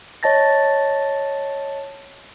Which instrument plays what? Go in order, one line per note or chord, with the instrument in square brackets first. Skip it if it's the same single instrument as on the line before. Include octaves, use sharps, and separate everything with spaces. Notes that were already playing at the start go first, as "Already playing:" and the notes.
[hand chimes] C#5 D#5 A5 A6 A#6